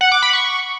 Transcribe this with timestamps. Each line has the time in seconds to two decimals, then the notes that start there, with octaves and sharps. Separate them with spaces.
0.01 F#5
0.12 D6
0.22 B5
0.33 C#6